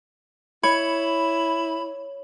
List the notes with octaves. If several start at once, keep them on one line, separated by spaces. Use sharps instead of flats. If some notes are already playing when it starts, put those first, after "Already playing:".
E4 C#5 B5